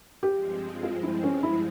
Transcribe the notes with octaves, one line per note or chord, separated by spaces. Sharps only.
G2 F3 G#3 C4 G4
F4
E4
C#4
E4